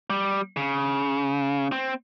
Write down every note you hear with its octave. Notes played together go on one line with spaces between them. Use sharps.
G3
C#3
C4